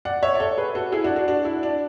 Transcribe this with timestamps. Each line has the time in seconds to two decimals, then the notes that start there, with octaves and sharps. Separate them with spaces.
0.05 D5 F#5
0.23 C#5 E5
0.35 D5
0.40 A4 C#5
0.57 G#4 B4
0.75 F#4 A4
0.92 E4 G#4
1.04 D4 F#4
1.16 D4 F#4
1.28 D4 F#4
1.45 E4
1.63 D4